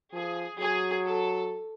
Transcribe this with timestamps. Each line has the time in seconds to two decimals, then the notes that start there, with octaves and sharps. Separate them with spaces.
0.12 F3 G#4
0.59 F#3 G#4
1.06 A4